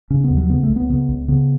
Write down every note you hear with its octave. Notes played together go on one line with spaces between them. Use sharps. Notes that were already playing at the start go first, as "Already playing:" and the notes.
C#3 C#4
B3
D#2
F#3
C#3 B3
A3
C#2
B3
C#3 B3
C#2
C#3 B3